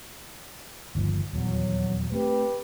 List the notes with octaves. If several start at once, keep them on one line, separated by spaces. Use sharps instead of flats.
G1 D#2 F3
D#1 E2 F#3
A3 C4 G4 B4